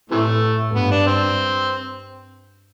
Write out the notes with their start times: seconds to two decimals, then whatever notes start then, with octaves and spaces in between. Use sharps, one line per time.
0.11 A2 C3 E3 A3
0.75 G2 B3
0.91 D4
1.07 C4